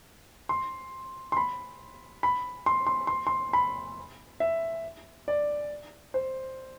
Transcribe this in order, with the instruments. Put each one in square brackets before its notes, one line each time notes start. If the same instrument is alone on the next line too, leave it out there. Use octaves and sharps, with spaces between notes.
[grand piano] C6
C6
B5
B5
C6
C6
C6
C6
B5
E5
D5
C5